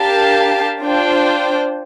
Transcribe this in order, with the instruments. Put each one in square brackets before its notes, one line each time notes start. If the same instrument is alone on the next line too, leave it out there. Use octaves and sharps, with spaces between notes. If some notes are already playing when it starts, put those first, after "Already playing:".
Already playing: [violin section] D4 G4 A#4 F5 A5
D4 F4 C5 G5